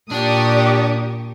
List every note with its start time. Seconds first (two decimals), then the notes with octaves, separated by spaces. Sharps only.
0.11 A#2 D4 G4 D5 C#6 D#6